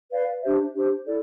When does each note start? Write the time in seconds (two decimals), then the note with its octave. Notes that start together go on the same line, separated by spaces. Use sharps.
0.11 B4 D5 F5
0.42 D4 G4 C5 E5
0.74 D4 G4 C5
1.06 E4 A4 D5